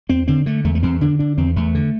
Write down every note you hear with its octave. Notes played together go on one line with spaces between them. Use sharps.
E2 C4
D3 C4
D3 A3
E2 A3
A3
E2 C4
D3 D4
D3 D4
E2 C4
E2 A3
D3